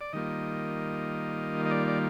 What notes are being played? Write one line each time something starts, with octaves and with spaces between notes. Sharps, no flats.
D5
D#3 G3 A#3 F4 D#5
D#5
D5
D5